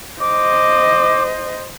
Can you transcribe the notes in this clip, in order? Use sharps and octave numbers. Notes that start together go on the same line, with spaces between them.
C5 D#5 D6